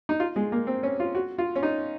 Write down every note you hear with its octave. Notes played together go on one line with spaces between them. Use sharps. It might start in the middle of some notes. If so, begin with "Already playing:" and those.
D#4
F4
G#3
A#3
C4
C#4
F4
F#4
F4
C#4
D#4